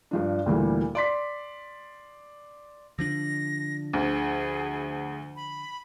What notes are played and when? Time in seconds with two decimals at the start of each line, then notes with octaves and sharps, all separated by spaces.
0.11 G2 F3 D4
0.46 D2 A#2 E3 G3
0.95 D5 C6 B6
2.99 D3 F3 D4 A#6
3.93 D2 G#4
5.36 B5